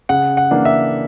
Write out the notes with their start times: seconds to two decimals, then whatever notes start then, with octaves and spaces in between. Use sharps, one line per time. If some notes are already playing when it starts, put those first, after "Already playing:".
0.09 C#3 F#5
0.37 F#5
0.51 E3 A#3 D4
0.65 E5